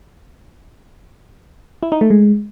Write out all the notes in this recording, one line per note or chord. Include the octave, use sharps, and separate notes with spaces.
E4
D#4
A3
G#3